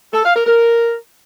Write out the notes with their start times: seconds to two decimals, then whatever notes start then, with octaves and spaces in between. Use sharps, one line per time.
0.14 A4
0.25 F5
0.35 A#4
0.46 A#4